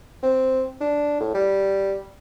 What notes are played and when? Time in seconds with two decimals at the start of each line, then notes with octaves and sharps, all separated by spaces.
0.23 C4
0.81 D4
1.20 A2
1.34 G3